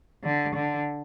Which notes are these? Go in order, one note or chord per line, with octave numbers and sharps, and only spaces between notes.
D3
D3